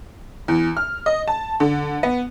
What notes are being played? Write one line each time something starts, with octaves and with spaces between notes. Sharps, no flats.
E2
F6
D#5
A5
D3
B3